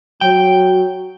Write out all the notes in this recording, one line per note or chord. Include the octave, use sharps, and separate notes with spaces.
F#3 G5